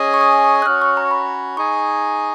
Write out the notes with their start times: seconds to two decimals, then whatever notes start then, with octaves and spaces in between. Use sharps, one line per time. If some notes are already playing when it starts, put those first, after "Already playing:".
Already playing: C#4 G#4 D#5 G#5
0.14 C#6
0.21 D#6
0.33 D#6
0.44 C#6
0.56 D#6
0.62 F#6
0.66 C#4 F#4 C#5 F6
0.82 C#6
0.97 A#5
1.11 B5
1.57 D#4 G#4 D#5 G#5 C#6